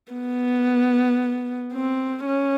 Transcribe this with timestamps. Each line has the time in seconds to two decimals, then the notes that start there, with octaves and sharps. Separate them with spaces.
0.12 B3
1.73 C4
2.26 C#4